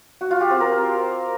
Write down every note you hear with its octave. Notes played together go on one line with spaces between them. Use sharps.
F#4
F4
G4
C4
A#4